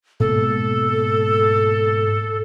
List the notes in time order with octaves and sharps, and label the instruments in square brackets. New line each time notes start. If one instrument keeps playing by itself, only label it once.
[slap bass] G#2 B2 A#3 [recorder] A4